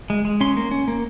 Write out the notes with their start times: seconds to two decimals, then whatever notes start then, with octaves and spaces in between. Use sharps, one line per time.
0.10 G#3
0.25 G#3
0.41 C#4 C6
0.57 A#3
0.71 C#4
0.88 A#3